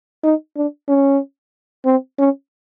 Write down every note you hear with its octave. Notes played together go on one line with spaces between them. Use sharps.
D#4
D4
C#4
C4
C#4